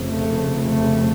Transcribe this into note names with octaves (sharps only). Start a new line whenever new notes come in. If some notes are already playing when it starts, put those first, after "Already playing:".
Already playing: F1 F2 C#3
A3
A3